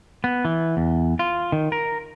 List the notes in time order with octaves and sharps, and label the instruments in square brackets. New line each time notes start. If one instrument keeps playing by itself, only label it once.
[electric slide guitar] B3
E3
E2
F4
D#3
A#4